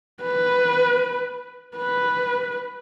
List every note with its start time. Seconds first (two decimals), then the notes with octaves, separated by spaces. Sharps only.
0.23 B4
1.77 B4